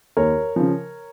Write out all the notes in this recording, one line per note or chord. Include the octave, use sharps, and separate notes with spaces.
D#2 A#4 C#5
C#3 F3